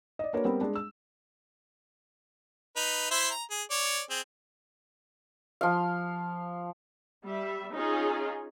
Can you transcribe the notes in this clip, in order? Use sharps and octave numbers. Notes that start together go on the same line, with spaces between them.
D5 D#5
A#3 D4 F#4 A#4 B4 C#5
G3 B3 C4 A#4
G#3 D4
E6
D#4 B4
E4 C5 E5
A#5
G#4
C#5 D5
C4 G#4
F3 F5
G3 E5
C#4 D#4 F4 G#4